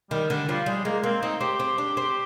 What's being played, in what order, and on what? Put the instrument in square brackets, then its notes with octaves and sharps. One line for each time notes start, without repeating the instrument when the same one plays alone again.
[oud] D#3 [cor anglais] G3
[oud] D3 [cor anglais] G3
[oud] F3 [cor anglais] G3
[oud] G3 [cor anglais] G#3
[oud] G#3 [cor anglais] A#3
[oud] A#3 [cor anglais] C4
[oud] C4 [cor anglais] D#4
[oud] C4 [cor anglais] G4
[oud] C4
D4
C4